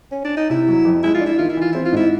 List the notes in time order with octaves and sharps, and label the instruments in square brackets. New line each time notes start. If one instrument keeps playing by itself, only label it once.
[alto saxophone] C#4
D4
D#4
[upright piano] C3 [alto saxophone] E4
[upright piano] F#3
F2
[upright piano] G#3 [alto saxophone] E4
[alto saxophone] F4
[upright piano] D4
[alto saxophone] E4
[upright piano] D#3 [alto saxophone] F4
[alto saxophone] E4
[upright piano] E3 [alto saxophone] F4
[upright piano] C4 [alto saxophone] E4
[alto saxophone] F4
[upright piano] G#2 [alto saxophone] E4